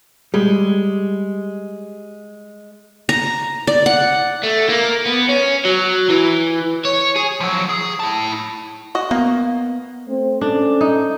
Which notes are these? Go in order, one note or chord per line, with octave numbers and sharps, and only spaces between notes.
G3 G#3
A#5
D5
F#5
A3
A#3
B3
C#4
F#3
E3
C#5
G#4
F3 F#3
G#4
E4 A5
F#4 D#5
A#3 B3
A3 C4 C5
C#4 D4 A4
D#4